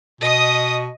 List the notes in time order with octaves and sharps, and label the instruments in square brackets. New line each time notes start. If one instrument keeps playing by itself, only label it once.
[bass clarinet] B2 [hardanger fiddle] D#5 D#6